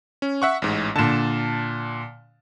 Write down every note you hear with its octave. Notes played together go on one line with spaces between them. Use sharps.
C#4
E5 F#5 C#6
A1 G#2
A#2 D3 A5 E7